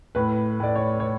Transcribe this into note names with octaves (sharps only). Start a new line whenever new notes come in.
A2 B4
A2 D5
C#5
C#5